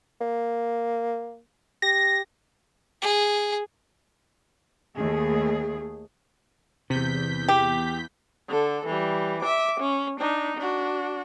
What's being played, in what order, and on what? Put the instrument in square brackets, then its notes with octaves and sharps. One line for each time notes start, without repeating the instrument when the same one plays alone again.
[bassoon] A#3
[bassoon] G4 [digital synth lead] A#6
[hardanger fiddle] G#4
[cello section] D#2 A3 G#4
[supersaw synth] E2 G6 B6 [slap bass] C3
[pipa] G4
[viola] D3 A4
E3 G3
E5 D6
C#4
D4 D#4
D4 F#4